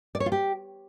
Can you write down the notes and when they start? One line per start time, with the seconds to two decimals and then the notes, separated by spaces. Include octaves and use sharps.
0.15 D5
0.20 C#5
0.26 F4
0.32 G4